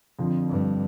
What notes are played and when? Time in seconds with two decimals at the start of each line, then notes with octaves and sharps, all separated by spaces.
0.19 F2 D3 F3
0.50 G2